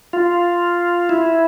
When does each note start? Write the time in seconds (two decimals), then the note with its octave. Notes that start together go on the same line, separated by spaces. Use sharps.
0.13 F4
1.09 E4